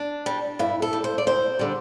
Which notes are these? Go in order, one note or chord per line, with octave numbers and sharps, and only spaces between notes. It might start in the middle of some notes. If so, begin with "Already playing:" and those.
Already playing: D4
G3
G2 E4
A4
G3
C5
D5
D2 C5
D3 G3